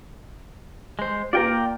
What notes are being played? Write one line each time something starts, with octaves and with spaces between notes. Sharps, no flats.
G#3 C5
A#3 F4 D5 G5 A#5